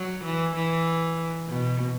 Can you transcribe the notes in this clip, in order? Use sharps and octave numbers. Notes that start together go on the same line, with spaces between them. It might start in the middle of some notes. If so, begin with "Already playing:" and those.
Already playing: F#3
E3
E3
B2